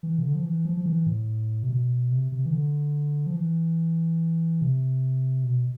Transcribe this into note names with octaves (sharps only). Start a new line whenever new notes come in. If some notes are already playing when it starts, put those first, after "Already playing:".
E3
C3
D3
F3
E3
F3
F3
E3
A2
C3
B2
C3
C3
E3
D3
F3
E3
C3
B2